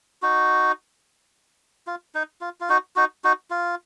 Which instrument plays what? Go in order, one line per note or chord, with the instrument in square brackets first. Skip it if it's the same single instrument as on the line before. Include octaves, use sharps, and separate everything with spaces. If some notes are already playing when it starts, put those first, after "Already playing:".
[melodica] D#4 F#4
F4
D#4
F4
F4
D#4 F#4
D#4 F#4
D#4 F#4
F4